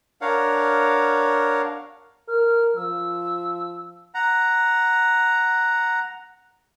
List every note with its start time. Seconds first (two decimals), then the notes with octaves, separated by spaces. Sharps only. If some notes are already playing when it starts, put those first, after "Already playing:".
0.21 D4 A#4 C#5 F5 F#5
2.28 A#4 F6
2.76 F3 E6
4.14 F#5 A#5